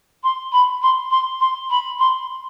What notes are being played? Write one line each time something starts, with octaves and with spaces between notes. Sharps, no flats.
C6
B5
C6
C6
C6
B5
C6